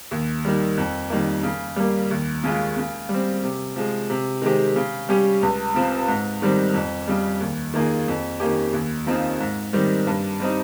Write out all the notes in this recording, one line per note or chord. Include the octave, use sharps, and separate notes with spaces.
D#2
D#3 G3
F2
D#3 G3 A#3
C#3
G3 A#3
D#2
C#3 G#3 C#4 F4
C#3
G3
C4
C3
F3 G#3
C3
D#3 G#3 C4 G4
C#3
G3 C#4 G4
C#2
C#3 F3 C4
G#2
D#3 G3 C4
F2
C#3 G3
D#2
D#3 A#3 F4 G#4
F2
D#3 A#3 C#4 G4
D#2
C#3 F3 C4 D#4
G#2
D#3 G3 C4
G2
G3 C4 D#4